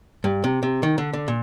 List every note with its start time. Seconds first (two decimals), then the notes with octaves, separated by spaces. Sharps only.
0.24 G2
0.44 C3
0.63 C3
0.83 D#3
0.98 D3
1.13 D3
1.28 A#2